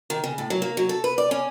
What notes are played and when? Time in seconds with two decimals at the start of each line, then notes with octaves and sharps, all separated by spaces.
0.10 D#3
0.24 C#3
0.38 A2
0.50 F#3
0.62 A#3
0.77 F#3
0.89 A4
1.04 B4
1.18 D5
1.31 C#4